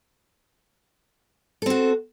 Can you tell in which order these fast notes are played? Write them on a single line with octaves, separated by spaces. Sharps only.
A4 C4 F#4